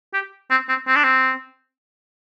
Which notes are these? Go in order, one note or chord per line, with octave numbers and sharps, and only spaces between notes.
G4
C4
C4
C4
D4
C4